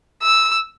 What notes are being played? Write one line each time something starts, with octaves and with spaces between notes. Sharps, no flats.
E6